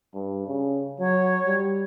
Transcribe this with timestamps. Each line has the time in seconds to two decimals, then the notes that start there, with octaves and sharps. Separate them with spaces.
0.14 G2
0.47 C#3
1.00 F#3 C#5
1.46 G3